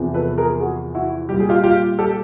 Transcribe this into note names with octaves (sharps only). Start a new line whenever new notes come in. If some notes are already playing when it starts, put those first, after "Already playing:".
Already playing: E2 C3 F3
A4 B4
G#4 A#4
F#4 G#4
E4 F#4
A#2 G3 G4
G#4
F4 G4
F4 G4
G4 A4